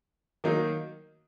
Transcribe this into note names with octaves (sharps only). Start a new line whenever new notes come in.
D#3 F#3 A#3 D#4